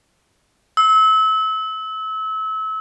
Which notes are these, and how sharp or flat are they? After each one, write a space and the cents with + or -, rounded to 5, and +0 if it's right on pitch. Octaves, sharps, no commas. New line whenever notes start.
E6 -30